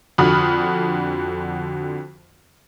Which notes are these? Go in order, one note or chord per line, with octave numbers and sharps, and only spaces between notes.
F2 D3 F#4 B5 D#6 F6